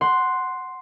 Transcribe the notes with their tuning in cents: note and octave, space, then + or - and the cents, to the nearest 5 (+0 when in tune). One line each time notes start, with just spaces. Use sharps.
F#5 +0 C6 +0